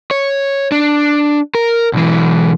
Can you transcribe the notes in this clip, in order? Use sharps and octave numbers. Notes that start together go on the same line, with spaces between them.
C#5
D4
A#4
B1 E3